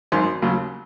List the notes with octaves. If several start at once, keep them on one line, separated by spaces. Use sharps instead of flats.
G#1 F#2 D#3 C6
D#2 C#3 F#3